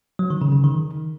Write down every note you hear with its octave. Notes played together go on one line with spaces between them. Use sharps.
F#3
D#3
C#3
C#3
D#3